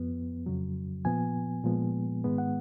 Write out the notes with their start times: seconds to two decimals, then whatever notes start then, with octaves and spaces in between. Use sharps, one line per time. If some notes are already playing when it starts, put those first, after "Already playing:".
Already playing: F2 F3 B3
0.46 F2 C#3 F#3
1.05 A#2 F3 B3 G#5
1.64 A#2 F3 G#3 B3
2.24 G#2 D#3 G#3 B3
2.38 F#5